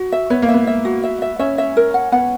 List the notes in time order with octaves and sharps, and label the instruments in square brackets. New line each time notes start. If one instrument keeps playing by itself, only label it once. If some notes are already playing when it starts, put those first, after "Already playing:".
Already playing: [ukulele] F#4
E5
[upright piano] B3 [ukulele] C#5
[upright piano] A#3
[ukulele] E5
[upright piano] B3
[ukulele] E5
F#4
E5
E5
[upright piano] C#4 [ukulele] E5
[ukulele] E5
A#4
F#5
[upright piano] B3 [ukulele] F#5